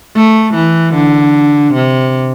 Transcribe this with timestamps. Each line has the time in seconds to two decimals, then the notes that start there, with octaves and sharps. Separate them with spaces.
0.15 A3
0.54 E3
0.95 D3
1.74 C3